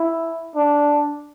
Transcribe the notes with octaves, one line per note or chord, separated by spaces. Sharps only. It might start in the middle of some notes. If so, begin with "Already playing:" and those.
Already playing: E4
D4